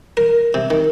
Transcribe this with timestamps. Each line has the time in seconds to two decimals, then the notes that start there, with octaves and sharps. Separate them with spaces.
0.17 A#4
0.54 C3
0.70 D#3